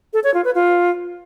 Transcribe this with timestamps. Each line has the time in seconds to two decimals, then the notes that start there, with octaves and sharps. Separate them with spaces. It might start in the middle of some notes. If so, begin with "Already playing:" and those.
0.13 A4
0.24 C#5
0.34 F4
0.44 B4
0.55 F4